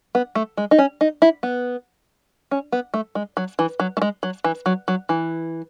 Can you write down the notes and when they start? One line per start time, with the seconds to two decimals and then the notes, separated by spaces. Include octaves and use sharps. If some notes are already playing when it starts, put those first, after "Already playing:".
0.15 B3
0.35 A3
0.57 G#3
0.71 D#4
0.78 C#4
1.01 D#4
1.22 E4
1.43 B3
2.51 C#4
2.72 B3
2.94 A3
3.15 G#3
3.37 F#3
3.59 E3
3.80 F#3
3.97 A3
4.02 G#3
4.23 F#3
4.44 E3
4.66 F#3
4.88 F#3
5.09 E3